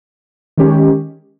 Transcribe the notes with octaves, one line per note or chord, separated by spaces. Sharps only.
D#3 G#3 C#4 G4